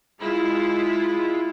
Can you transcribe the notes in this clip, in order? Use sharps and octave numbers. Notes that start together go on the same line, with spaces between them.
G#3 E4 F4